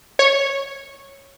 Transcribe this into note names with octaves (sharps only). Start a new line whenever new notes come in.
C#5